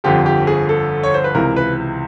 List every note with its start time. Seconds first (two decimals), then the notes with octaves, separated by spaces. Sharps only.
0.04 G1 F2 D3 F3 G4
0.26 G4
0.47 G#4
0.69 A4
1.03 C#5
1.14 C5
1.24 B4
1.35 C#2 C3 E3 A#4
1.56 B4